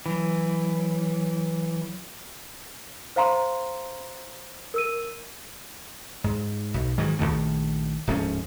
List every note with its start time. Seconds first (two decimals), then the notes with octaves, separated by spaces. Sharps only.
0.06 E3 F#3
3.16 C5 F5 A#5 C6
4.74 A#4 E6 D#7
6.24 G#2
6.74 B1
6.98 G#2 D#3 E3 F#3
7.19 A#1 D#2 D#3 A3
8.07 D1 G#2 F3 C#4